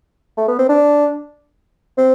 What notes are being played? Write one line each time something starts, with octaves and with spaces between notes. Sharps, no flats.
A3
B3
C4
D4
C4